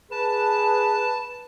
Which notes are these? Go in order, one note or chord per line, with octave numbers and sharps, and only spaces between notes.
G#4 B4 A5